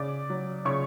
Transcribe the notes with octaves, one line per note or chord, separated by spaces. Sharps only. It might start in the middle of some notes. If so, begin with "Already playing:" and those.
Already playing: C#3 D5 D6
F#3
C#3 C#5 C#6